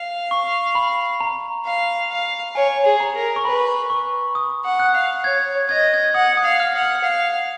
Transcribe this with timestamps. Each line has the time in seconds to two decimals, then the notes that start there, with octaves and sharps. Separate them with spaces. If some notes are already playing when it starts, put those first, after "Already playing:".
Already playing: F5
0.31 C#6
0.75 B5
1.21 A#5
1.66 F5
2.10 F5
2.55 C#5 G#5
2.85 G#4
3.00 A#5
3.15 A#4
3.36 C#6
3.45 B4 B5
3.90 C#6
4.35 D#6
4.65 F#5
4.79 F#6
4.95 F5
5.24 C#5 G#6
5.69 D#5 G#6
5.81 A#6
5.94 G#6
6.14 F#5 D#6
6.37 D#6
6.44 F5
6.60 F6
6.74 F#5
6.82 F6
7.04 F5